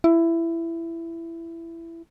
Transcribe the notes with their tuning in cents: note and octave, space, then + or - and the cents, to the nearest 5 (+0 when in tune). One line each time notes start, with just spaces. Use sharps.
E4 +15